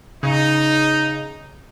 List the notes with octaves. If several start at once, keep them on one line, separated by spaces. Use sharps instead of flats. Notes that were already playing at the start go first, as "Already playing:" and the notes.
C#3 D#4